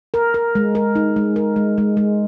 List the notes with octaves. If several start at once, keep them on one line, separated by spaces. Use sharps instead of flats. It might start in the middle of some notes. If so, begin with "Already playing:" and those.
A#4
A#4
G#3
A#4
D#4
G#3
A#4
G#3
G#3
G#3